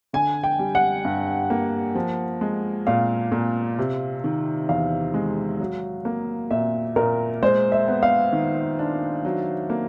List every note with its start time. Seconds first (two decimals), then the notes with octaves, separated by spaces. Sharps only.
0.13 D3 G#5
0.44 G5
0.59 G3
0.75 F#5
1.05 G2
1.50 A#3
1.95 F3
2.41 G#3
2.87 A#2 F5
3.32 A#2
3.78 C3
4.24 D#3
4.69 E2 F5
5.14 G#3
5.60 F#3
6.05 A#3
6.51 A#2 E5
6.96 A#2 A#4
7.43 G#3 C5
7.72 E5
7.88 B3
8.03 F5
8.33 D#3
8.79 D4
9.25 F#3
9.70 A#3